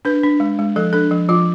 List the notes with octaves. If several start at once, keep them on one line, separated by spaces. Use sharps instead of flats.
D4 B4
D4
G#3
G#3
F3 A4
D4 A4
F3
F3 F4